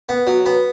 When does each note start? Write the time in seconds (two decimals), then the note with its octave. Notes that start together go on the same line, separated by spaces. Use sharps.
0.09 B3
0.27 F#3
0.46 B3